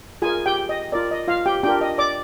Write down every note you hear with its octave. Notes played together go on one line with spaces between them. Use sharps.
F4 G#4 A#4 G#5
G4 G5
D#5
F4 A#4 D5
D#5
F4 F5
G4 G5
D4 F4 G4 A#4 G5
D#5
D5 D6